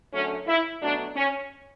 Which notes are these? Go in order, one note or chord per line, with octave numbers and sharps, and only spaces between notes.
F#2 D3 F#3 A3 C#4
E4
B2 F#3 A3 D4
C#4